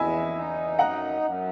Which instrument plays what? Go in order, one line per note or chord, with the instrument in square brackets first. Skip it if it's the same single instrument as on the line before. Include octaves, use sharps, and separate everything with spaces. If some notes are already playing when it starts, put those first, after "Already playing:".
Already playing: [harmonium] E2 E4 [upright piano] D#5 E5 G#5
[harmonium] D#4
[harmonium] F#2 [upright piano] F#5 A#5
[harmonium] F#2